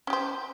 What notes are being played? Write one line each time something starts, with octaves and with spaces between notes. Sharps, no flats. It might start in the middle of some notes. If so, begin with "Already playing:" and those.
C#4 G4 C5